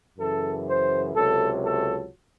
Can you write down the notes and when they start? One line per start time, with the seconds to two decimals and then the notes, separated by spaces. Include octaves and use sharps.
0.19 F#2 C#3 E3 A4
0.67 C5
1.14 C#2 C3 F#3 A4
1.62 A4